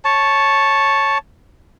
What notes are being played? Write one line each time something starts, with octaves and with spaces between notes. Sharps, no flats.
C#5 A5